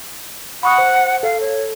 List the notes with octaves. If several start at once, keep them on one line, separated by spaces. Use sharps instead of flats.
F#5 B5 C#6 D#6
C5
A4 F5
C#5